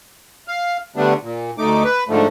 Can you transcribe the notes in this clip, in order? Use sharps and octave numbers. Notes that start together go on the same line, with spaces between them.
F5
D3 G3 A3 B3 D4
A#2
D2 A3 D#4 D6
B4
G#2 D3 F3 A3